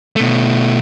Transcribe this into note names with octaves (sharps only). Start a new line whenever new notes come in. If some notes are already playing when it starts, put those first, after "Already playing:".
B2 A3